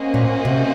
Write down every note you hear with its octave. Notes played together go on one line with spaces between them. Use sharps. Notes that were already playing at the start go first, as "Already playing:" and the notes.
Already playing: A#3 C#4 F#4 C5 D#5
A#2
C3